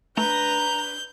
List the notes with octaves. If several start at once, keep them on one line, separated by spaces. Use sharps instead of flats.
A3 D4 B4 A#5 G6